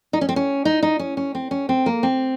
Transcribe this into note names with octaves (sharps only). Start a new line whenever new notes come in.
D#4
C#4
C4
C#4
D#4
D#4
C#4
C#4
C4
C#4
C4
A#3
C4